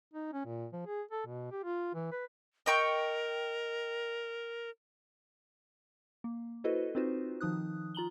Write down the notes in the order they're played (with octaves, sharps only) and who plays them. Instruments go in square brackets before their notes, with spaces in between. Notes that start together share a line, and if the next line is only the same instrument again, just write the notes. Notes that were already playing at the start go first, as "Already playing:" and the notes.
[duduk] D#4
C#4
A#2
F3
G#4
A4
B2
G4
F4
E3
B4
[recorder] A#4 [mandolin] D#5 G5 C#6
[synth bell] A#3
E4 F#4 A4 B4 C5 D#5
C4 D#4 F4 F#4 B4 C5
D#3 F3 D#4 D#6 F#6
F4 A#5 F#7 G7